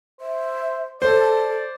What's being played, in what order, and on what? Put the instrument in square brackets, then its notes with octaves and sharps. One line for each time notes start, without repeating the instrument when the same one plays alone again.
[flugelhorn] C5 [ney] E5
[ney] A4 [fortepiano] C5 [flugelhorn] D5